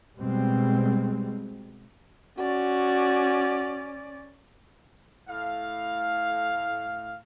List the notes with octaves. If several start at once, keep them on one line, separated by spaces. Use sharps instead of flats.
B2 G3 G#3 C4
C#4 F#4 D5
A2 F5